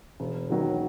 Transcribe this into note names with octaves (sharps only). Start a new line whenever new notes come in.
E1
D#2 D#3 F#3